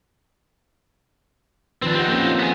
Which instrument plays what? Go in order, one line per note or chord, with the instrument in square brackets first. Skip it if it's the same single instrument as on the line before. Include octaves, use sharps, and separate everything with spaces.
[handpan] D#3 F3 B4 [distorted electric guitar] C4 D4
[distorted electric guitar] C4 D#4 [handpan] G4 F#5
[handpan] A#3 C#4 A4
C#4 F4
[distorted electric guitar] B3 G#4